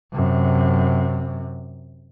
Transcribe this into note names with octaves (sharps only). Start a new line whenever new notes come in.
F#2 C3